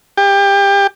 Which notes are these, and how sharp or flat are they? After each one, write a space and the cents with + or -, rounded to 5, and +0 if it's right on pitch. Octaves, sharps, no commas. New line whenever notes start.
G4 +25